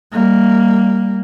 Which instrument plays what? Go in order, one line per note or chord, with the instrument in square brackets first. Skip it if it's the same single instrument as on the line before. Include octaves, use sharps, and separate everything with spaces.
[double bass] G3 A#3